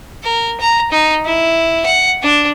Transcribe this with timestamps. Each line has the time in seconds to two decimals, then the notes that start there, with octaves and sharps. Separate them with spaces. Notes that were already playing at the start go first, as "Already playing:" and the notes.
0.23 A#4
0.60 A#5
0.91 D#4
1.25 E4
1.85 F#5
2.22 D4